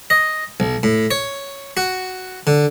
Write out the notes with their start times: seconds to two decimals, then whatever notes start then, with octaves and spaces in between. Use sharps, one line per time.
0.10 D#5
0.60 B1
0.83 A2
1.11 C#5
1.77 F#4
2.47 D3